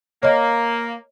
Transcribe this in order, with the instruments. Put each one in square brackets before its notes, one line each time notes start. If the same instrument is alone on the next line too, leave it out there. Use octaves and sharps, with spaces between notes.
[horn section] A#3 [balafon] C#5 D#5